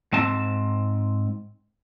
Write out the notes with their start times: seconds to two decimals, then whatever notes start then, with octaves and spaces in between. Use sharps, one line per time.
0.13 G#2 C4 A5